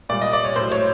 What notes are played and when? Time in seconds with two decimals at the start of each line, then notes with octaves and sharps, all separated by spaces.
0.09 A#2 G3 D5
0.21 D#5
0.33 D5
0.45 C#5
0.56 A2 F#3 C5
0.72 C#5